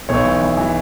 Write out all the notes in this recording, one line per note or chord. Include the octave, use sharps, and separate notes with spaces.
B1 C#5
E3
E3
E3